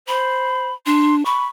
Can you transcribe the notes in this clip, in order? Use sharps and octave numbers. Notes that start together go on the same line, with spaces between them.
C5 B5
D4 C6
B5 C#6